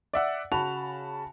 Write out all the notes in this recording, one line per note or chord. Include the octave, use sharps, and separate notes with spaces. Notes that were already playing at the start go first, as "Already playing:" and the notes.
D5 E5 F#5
C#3 F#4 A5 B5 F7